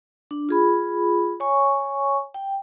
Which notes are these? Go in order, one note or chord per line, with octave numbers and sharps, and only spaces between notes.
D4
F4 G#4 B5
C#5 G#5 C#6
G5